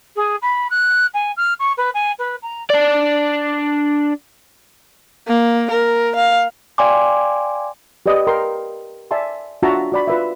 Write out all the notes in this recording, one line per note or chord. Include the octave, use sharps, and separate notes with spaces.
G#4
B5
F#6
G#5
F6
C#6
B4
G#5
B4
A#5
D4 D5
A#3
A#4
F5
D5 F5 G5 G#5 C6 D6
G4 B4 D5 D#5
A#4 G5 C6
D5 E5 G#5 A5 C6
D4 F4 F#4 E5 A5 A#5
F#4 D5 B5
F4 B4 E5